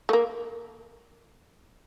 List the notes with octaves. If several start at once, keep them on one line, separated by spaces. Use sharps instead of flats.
A3
A#3